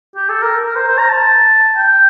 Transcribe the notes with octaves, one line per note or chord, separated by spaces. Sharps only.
G4
A4
A#4
A#4
C5
C5
A#5
A5
G5